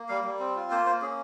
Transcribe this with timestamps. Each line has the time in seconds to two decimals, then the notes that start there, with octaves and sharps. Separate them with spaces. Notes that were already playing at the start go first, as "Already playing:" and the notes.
Already playing: A#3
0.09 G3 F5
0.24 G3
0.39 C4
0.56 F4
0.71 A#3 C5
0.85 A#3 C5
1.02 C#4 G#4